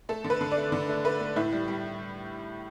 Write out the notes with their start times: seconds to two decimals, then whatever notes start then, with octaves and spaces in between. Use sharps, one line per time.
0.09 A3 A4
0.24 D3
0.30 B4
0.41 D3
0.51 D5
0.57 A3
0.72 D3
0.89 A3
1.04 A3 B4
1.20 A3
1.36 A2 E4
1.52 G3
1.68 G3